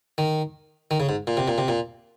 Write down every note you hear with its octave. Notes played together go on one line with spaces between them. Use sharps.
D#3
D#3
C#3
G#2
A#2
C3
A#2
C3
A#2